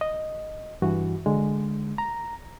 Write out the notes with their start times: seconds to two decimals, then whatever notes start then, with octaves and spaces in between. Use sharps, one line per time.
0.01 D#5
0.82 G2 E3 F#4
1.26 D3 G#3
1.98 A#5